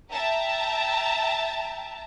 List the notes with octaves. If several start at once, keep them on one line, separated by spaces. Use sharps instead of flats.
E5 G5 A5 A#5